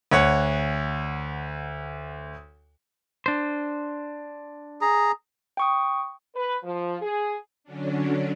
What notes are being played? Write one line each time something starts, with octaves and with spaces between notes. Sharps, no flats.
D2 C#5 F#5
D4 C5
G#4 A#5
G5 C#6 D#6
B4
F3
G#4
D3 F#3 C#4 D4